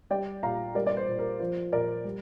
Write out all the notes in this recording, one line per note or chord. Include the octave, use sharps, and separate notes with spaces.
G3 D5 G5
A#2 F5 A#5
G3 A#4 D5
D5
C5
A#2
A#4
F3 C5
A#2 A#4 D5
G3